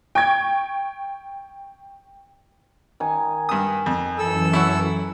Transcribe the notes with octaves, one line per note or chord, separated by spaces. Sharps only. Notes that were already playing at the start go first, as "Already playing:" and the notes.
G5 C#6 G#6
D#3 G#5
G2 D#6
F2
F#2 E3 A4 E6
E4 C#5 F#5